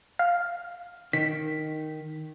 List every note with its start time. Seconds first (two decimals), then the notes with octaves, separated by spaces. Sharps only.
0.19 F5
1.13 D#3 B6